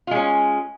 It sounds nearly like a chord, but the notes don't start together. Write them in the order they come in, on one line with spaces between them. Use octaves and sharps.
F4 G#3 C#4